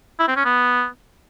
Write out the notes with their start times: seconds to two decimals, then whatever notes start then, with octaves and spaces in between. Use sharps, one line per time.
0.19 E4
0.28 C4
0.36 C#4
0.45 B3